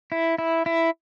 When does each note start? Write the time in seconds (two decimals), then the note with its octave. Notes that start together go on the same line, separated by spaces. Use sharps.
0.12 E4
0.38 E4
0.66 E4